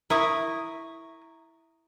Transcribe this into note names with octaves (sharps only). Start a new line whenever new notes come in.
E4 A#4 C#6 D#6